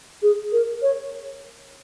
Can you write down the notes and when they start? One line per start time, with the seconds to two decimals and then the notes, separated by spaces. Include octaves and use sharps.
0.22 G#4
0.52 A#4
0.82 C#5